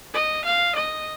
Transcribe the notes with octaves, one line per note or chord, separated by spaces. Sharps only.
D#5
F5
D#5